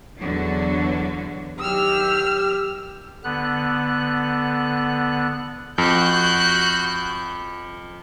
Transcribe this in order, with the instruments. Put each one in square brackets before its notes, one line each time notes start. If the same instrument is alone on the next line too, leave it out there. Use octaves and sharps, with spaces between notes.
[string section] E2 D3 F#3
[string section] D#3 F#3 [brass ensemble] G4 [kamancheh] E6 F6
[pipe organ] D3 B3 F#6
[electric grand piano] F2 [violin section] F#4 F#6 G6